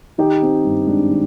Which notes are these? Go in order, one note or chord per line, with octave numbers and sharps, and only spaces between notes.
D#3 D#4 G4
C4
G2
G#3 D4
D#3